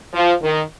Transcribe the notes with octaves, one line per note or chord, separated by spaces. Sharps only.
F3
D#3